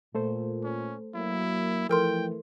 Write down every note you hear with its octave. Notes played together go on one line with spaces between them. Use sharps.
A#2 A3 A4 C5
C#4
F#3 A#3 E4
E3 F3 A3 E4 A4 A#4 G5 C6